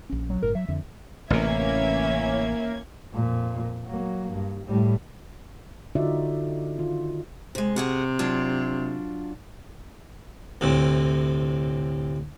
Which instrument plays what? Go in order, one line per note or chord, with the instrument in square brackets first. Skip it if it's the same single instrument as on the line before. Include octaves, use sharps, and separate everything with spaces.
[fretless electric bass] A#1 C#4
[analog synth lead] F#3
[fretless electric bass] G1 A2 [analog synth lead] A#4
[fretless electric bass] F#3 [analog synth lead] E5
[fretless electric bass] F2 D3
[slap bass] A1 C3 [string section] E3 C#4 G#6 [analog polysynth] A#3 [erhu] E5
[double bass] F2 A#2
F#3 A#3
G2
A2 G3
[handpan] D3 D#4 F4 F#4 D5 E5
D#3 F4
[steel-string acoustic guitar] C3 G#3
[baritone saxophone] C3 [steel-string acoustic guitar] F#4 G#4 F#5
[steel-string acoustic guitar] F#3 D4 F4
[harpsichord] D2 A2 C3